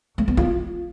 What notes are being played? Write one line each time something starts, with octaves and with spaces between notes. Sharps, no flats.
A3
B3
F4